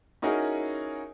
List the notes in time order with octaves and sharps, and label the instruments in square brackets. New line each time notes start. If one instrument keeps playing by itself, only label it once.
[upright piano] C#4 D#4 E4 F#4 G#4 A#4